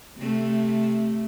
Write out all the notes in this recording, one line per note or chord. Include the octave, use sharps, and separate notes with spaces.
C3 A3